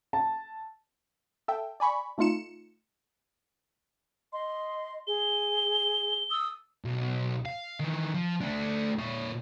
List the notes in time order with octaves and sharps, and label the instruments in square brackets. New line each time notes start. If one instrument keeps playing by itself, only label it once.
[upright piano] A5
[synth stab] A4 E5 G5
D5 G#5 B5 C#6
C3 A3 D#4 F4 C#7 E7
[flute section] D#5 [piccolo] C6
[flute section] G#4 [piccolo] G7
[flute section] D#6 E6
[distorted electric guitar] B1
F5
D#3 E3
F3
A3 D4
A#2 C#5